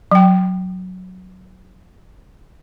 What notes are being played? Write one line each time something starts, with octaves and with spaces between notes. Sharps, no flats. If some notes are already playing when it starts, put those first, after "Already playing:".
F#3 G5